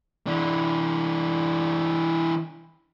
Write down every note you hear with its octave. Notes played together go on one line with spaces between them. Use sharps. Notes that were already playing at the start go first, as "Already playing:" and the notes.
E3 D4